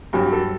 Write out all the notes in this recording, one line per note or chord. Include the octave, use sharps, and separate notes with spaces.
G2 F#3 G4
A4